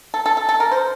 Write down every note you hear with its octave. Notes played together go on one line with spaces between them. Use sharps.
A4
A4
A4
A4
A#4
C5